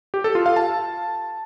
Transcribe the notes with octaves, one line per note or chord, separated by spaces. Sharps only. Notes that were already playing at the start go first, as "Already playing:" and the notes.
G4
A4
F4
F5
A5